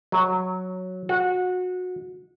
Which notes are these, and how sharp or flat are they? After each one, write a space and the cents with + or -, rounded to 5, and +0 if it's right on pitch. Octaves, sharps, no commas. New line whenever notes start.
F#3 -5
F#4 -25